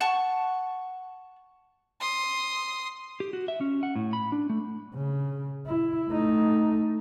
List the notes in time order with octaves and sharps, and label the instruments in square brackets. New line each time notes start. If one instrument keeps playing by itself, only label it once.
[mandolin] F#5 A5 C#6
[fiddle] C6 D#6
[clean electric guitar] G4
F#4
E5
C#4
F#5
A2
B5
D4
A3
[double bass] C#3
E4
A3 D#4